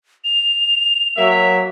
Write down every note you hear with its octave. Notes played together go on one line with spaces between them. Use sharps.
F7
F#3 A#3 E5